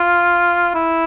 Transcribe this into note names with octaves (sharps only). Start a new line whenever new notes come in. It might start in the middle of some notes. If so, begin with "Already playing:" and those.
Already playing: F4
E4